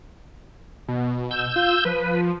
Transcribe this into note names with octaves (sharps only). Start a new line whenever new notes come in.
B2
E6 G6
F4
F3 B4